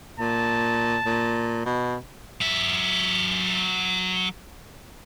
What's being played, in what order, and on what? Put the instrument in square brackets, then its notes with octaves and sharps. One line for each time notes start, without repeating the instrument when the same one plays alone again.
[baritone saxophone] A#2 [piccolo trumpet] A5
[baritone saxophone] A#2
B2
[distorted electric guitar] F#3 E5